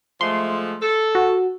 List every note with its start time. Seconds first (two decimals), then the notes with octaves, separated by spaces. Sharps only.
0.21 F3 G#3 A3 C6
0.81 A4
1.15 F#4